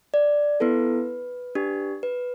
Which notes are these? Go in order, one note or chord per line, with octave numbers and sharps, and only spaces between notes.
D5
B3 E4 A4 B4
D4 G4
B4